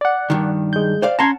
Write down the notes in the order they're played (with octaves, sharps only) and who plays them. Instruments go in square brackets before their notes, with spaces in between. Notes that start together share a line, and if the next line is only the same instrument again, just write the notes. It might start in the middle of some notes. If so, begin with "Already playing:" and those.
[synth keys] D5 F#5
[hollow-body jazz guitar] G2 D#3
[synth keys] G#3 G6
[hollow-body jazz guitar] C5 D5 F5
[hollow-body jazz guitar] C#4 F#5 A5 [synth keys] A#5 C6 G#6